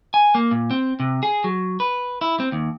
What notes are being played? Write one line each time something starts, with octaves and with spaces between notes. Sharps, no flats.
G#5
A#3
A#2
C4
C3
G#4
F#3
B4
E4
C4
D#2